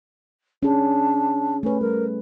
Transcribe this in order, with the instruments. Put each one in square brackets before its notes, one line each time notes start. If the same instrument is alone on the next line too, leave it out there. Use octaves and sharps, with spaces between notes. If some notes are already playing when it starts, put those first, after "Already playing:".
[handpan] C#4 G#4 [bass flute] D4
[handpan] A3 B4 [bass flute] C#4
[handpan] G3 [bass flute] A#4